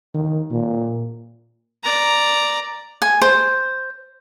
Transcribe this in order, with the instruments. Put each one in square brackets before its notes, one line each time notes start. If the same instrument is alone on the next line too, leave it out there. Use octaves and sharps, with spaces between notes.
[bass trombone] D#3
A#2
[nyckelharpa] D5 A#5
[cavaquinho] G#5
C5